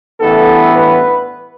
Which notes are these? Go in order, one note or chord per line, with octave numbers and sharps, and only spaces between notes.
A1 G2 E3 B3 A4
B4